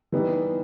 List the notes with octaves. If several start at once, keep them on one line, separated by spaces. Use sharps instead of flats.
E3 G3 B3 D#4